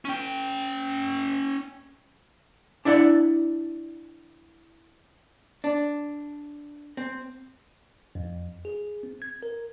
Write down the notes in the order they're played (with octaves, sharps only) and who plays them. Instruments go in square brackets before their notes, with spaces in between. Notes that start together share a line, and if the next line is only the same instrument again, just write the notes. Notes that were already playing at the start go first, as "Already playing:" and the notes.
[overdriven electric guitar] C#4 G5
[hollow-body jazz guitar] D4 E4 D5 F#5
D4
C4
[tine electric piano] F2
G#4
C4
G#6
A#4